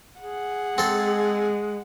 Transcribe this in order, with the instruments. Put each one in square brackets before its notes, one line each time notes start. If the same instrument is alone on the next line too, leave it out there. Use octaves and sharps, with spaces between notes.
[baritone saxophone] G#4 [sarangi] F#5
[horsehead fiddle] G#3 [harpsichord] C4 A4